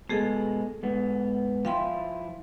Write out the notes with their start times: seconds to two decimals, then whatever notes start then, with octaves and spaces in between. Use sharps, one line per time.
0.09 B2 G#3 A3 G#4 A4
0.83 G#2 B3
1.65 F3 E4 F5 G5 C6